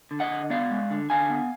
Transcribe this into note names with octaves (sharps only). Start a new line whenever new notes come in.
D3
D#5 F#5
D3
B3 D5 F5
G#3
D3
D3 F5 G#5
B3